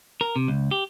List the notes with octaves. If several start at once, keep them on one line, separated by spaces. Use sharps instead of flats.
A#4
C3
C#2
G4